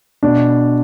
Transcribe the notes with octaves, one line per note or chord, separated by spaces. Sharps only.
B2 D4